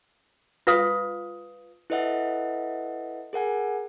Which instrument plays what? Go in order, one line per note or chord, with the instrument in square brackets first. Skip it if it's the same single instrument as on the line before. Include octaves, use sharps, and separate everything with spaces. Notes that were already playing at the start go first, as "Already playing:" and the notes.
[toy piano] F4 B4 F5 D#6
[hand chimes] E4 A4 B4 D#5 E5 F#5
G#4 A#4 F#5 G#5